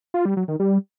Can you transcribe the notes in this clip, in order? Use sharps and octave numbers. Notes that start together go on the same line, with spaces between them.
F4
G3
F#3
D#3
G3